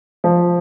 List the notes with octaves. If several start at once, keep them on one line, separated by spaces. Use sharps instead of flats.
F3